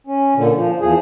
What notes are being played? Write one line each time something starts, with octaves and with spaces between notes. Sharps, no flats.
C#4
A#2 D3
F3
E2 F3 G#4